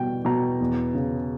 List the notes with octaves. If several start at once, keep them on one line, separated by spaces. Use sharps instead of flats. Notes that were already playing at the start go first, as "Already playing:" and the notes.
Already playing: B2 G3 G5
B2 A#5
E2
C#3